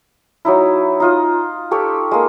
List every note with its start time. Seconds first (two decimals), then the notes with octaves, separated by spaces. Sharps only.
0.45 F#3 D#4 E4
1.00 D#4 F4 D#6
1.71 G4 A4 C#5
2.11 G#3 A#3